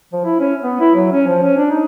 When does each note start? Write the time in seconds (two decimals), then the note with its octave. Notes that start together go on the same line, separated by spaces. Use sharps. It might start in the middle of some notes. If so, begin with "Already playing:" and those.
0.13 F3
0.25 E4
0.40 C#4
0.63 B3
0.80 E4
0.95 F#3
1.12 C#4
1.27 F3
1.42 C#4
1.57 D4
1.70 D#4